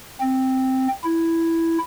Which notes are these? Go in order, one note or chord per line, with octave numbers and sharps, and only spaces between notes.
C4
E4